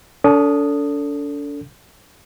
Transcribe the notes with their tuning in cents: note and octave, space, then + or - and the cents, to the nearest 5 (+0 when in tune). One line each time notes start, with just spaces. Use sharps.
D4 -40 A4 +15 D#6 -5